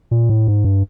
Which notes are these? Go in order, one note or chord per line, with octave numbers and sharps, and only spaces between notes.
A#2
A2
G#2
G2